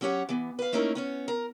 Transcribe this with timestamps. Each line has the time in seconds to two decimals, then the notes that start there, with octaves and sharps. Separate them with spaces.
0.01 F#3 C#4 G4 C#5 F#5
0.29 E3 B3
0.59 B4 F5
0.73 A3 A#3 C#4 D#4 E4 A#4
0.95 B3 C#4 C#5
1.28 A#4